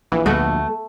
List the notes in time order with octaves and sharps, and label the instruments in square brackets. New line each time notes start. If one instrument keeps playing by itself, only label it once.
[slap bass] A#1 [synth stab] E3
[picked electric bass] D2 [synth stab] B2 F#4 [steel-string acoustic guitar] A3